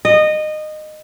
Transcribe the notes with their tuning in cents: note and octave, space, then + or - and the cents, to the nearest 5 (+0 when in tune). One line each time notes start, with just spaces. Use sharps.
D#5 -20